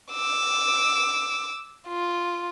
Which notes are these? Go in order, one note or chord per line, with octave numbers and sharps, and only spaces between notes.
D6 E6
F4